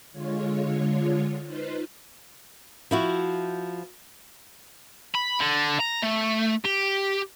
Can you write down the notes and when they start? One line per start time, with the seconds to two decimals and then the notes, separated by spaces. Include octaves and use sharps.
0.12 D3 G#3 F4 C#5
1.44 D#4 F4 B4 C5
2.91 F3 E4 F#4
5.15 B5
5.40 D3
5.80 A#5
6.03 A3
6.65 G4